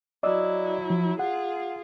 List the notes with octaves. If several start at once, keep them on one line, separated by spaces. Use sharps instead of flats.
F#3 E4 D5 D#5 E6
F3
F4 G#4 F#5